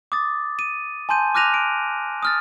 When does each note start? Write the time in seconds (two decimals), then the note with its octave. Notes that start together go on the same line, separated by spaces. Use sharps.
0.12 D6 D#6 A6
0.59 D#7
1.09 G#5 A5 C6 G6 D#7
1.35 D6 F6 F#6 A#6 D#7 F7
1.54 D7
2.23 D#6 F6 A6